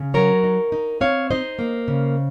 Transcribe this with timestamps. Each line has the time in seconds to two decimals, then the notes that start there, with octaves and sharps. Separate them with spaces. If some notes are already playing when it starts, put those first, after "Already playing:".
Already playing: C#3
0.14 F#3 A#4 C#5
0.44 D#4
0.72 D#4
1.01 C4 C#5 F5
1.31 D#4 C5 D#5
1.59 A#3
1.88 C#3